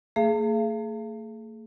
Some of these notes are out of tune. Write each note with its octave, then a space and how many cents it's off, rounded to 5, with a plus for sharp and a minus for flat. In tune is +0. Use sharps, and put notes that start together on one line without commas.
A3 +45 G#4 +30 F5 -45